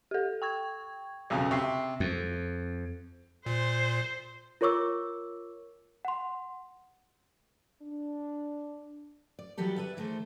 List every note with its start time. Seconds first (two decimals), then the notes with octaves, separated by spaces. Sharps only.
0.11 G4 A4
0.42 G5 C#6 G#6
1.30 B1 F2 C#3
1.51 C3 C#6 C7
2.00 F2
3.46 A#2 C5
4.61 F4 A#4 C#5 C#6 D6 E6
6.05 F#5 C6
7.83 D4
9.39 D5
9.57 D#3 E3 F#3 G3 G4 A4
9.78 B4 D5 E5
9.97 D#3 E3 A3 G#4 A4 C5